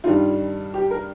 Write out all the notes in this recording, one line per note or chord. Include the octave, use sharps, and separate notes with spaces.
G2 D#3 G3 F4
G4
A#4